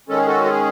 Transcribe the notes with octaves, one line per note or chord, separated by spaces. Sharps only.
D#3 G#3 C#4 A4
G#4
F#4 A4
A4
G#4